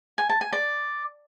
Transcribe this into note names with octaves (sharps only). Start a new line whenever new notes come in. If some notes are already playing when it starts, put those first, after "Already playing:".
G#5
A5
G#5
D5